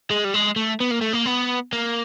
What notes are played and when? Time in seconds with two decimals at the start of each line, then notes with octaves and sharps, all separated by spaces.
0.11 G#3
0.24 G3
0.34 G#3
0.56 A3
0.81 B3
0.91 A#3
1.01 A3
1.13 A#3
1.26 B3
1.73 A#3